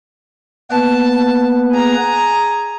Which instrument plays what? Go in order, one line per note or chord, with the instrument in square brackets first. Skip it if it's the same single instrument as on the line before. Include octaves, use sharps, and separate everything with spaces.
[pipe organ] A#3 B3 B4 [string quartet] A5
[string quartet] G#4 A#5